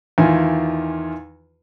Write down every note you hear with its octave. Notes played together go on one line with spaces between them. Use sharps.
E2 D#3 F4 G#5